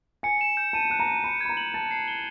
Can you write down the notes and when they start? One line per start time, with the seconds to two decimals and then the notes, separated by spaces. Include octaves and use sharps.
0.23 G#5 C#7
0.41 E7
0.57 G6
0.73 A5 D#7
0.90 A5 F#6
0.99 A#5
1.08 D#7
1.24 B5 C#7
1.41 B5 G#6
1.49 A#5
1.57 F#7
1.74 A5 A6
1.91 C7
2.08 G7